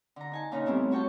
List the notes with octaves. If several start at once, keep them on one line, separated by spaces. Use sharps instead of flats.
D3 A#5
D#4 G#5 A5
A#2 C#3 C#4 D#4 A#5 F6
G3 A3 B3 C4 E4
B3 F#4 C#5 G5 A5